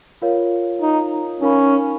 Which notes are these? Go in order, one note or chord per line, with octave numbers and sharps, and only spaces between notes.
F4 A#4 C#5 F5
D#4
C#4 D#4 A#4 F5 B5